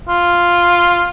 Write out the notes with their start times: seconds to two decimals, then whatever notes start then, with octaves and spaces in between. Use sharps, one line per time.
0.09 F4